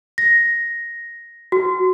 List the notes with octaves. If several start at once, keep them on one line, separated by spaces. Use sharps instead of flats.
A#6
F#4